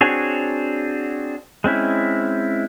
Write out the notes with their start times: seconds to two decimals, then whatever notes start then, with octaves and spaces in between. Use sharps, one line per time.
0.01 C4 D4 F#4 G#4 C#5
1.64 G#3 C4 C#4 E4